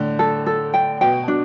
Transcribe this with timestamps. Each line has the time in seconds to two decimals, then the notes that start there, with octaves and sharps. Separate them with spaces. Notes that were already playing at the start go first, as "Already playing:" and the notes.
Already playing: A2 D3
0.19 A4
0.46 A4
0.74 G5
1.01 B2 G5
1.27 B2 D4